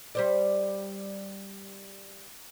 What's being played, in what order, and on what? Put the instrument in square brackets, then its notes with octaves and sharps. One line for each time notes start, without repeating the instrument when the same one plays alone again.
[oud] G3 C5 D5